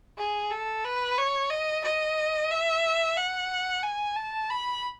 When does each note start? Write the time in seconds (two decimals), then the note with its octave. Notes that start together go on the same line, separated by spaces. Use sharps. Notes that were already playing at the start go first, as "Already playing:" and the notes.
0.18 G#4
0.50 A4
0.85 B4
1.18 C#5
1.50 D#5
1.84 D#5
2.51 E5
3.17 F#5
3.83 G#5
4.16 A5
4.50 B5